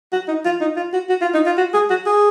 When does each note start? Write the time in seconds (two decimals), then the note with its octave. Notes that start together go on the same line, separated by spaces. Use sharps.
0.13 F#4
0.28 D#4
0.45 F4
0.61 D#4
0.77 F4
0.93 F#4
1.10 F#4
1.21 F4
1.34 D#4
1.46 F4
1.58 F#4
1.74 G#4
1.90 F#4
2.06 G#4